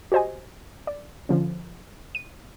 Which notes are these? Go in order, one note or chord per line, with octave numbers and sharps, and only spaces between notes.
F#4 G4 C5 D#5 G#5
D5
D3 F3 C#4
D#7